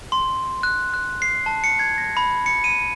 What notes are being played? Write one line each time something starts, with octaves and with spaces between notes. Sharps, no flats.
C6
F#6
F#6
C7
A5
C#7
G#6
A#6
B5
C#7
D#7